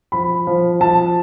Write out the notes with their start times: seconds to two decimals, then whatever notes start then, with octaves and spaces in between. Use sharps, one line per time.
0.12 F3 B5
0.47 F3
0.80 F3 A5